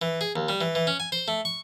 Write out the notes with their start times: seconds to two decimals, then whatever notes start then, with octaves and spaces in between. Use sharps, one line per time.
0.02 E3
0.21 G#4
0.36 D#2
0.49 G3
0.61 E3
0.75 E3
0.87 C#4
1.00 G#5
1.12 C5
1.28 A3
1.45 C#6